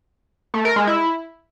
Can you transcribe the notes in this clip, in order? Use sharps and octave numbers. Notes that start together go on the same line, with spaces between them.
A3
A#4
G#3
E4